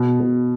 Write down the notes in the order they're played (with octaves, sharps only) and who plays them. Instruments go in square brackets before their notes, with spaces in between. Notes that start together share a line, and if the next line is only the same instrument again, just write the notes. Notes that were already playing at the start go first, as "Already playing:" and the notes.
Already playing: [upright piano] B2
B2